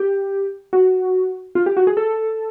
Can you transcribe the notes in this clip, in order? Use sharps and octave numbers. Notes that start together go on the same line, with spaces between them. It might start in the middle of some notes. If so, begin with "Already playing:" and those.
Already playing: G4
F#4
F4
G4
F#4
G#4
A4